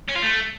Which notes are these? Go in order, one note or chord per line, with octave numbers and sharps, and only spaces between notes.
C#4
F4
A3